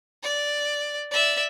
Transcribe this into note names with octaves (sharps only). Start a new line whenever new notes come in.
D5
D5 E5